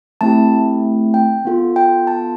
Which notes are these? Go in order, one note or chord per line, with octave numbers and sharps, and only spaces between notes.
A3 C4 E4 G4 A5
G5
B3 F4 A4
G5
A5